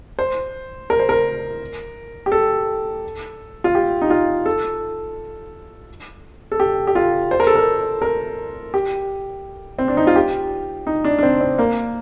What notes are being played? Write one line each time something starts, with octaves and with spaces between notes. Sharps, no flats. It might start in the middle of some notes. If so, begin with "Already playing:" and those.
C5
A#4
C5
A#4
G4
A4
F4
G4
D#4
F4
A4
A4
G4
G4
F4
C5
A#4
A4
A#4
A#4
G4
C4
D4
D#4
F4
G4
D#4
D4
D4
C4
C4
A#3